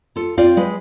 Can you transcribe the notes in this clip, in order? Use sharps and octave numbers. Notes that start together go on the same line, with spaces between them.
F4 A4
C4 F4 D5 F5
G#3 B4